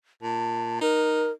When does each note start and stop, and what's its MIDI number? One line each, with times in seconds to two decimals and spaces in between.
0.22 0.79 46
0.22 0.79 81
0.81 1.30 63
0.81 1.31 70